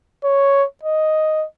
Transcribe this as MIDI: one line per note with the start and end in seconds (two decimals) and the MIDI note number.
0.24 0.64 73
0.83 1.45 75